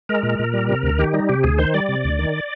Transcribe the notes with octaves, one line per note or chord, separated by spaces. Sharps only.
G#3 A#4
A#2
A#2
G3
C3
D2
D#3 G4
G3 D#4
C3 G4
D2 G#4
D#3 C5
G3 D5
C3
D2
D#3